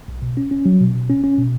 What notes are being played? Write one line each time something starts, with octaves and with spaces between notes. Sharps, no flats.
B1
B2
C#4
C#4
F#3
B2
B2
C#4
C#4
B2